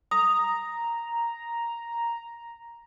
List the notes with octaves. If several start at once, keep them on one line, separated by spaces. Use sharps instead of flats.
A#5 D#6